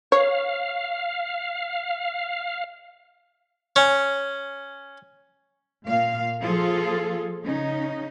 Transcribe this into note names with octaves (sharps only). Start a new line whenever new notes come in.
C#5 F5
C#4
A#2 F5
F3 A#3 F4 G#4 A4
C#3 C#4 D#4